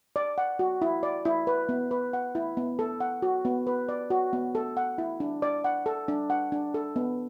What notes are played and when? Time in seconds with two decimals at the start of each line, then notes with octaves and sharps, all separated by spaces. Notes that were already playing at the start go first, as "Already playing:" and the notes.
0.16 D5
0.38 F#5
0.59 F#4
0.82 E4
1.03 D5
1.25 E4
1.47 B4
1.69 B3
1.91 B4
2.13 F#5
2.35 E4
2.57 B3
2.79 A4
3.00 F#5
3.22 F#4
3.45 B3
3.67 B4
3.89 D5
4.10 F#4
4.33 B3
4.55 A4
4.77 F#5
4.98 E4
5.20 D4
5.42 D5
5.64 F#5
5.86 A4
6.08 D4
6.30 F#5
6.52 D4
6.74 A4
6.96 B3